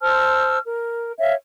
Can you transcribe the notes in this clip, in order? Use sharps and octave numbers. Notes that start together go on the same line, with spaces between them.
C5 A5 E6 F6
A#4
C#5 E5 F5